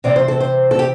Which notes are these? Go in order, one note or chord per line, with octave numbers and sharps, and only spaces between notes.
C3 E3 C4 D5
C5
A4
C5
A4
G4